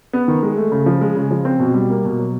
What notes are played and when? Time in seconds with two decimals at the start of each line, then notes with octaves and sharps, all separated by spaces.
0.13 B3
0.28 D#3
0.43 G#3
0.57 A3
0.72 C#3
0.86 F3
1.01 G#3
1.16 C#3
1.31 F3
1.45 C4
1.59 B2
1.74 G3
1.90 A#3
2.04 B2
2.19 F#3